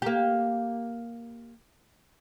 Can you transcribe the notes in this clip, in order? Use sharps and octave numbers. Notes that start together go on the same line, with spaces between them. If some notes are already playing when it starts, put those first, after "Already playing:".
A#3 G4